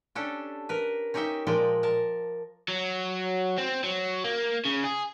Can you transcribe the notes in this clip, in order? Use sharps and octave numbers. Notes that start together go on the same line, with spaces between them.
C#4 D4 G4 A4
A#4 B4
C#4 D#4 G4 C#5 E5 G5
A#2 F3 G#3 A#4 D5 G5
A#4 A5
F#3
C4
F#3
A#3
C#3
G#4